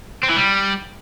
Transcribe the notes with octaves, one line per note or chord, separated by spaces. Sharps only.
C4
E3
G3